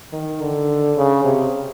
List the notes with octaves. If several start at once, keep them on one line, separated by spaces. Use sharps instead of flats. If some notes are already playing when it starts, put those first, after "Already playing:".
D#3
D3
C#3
C3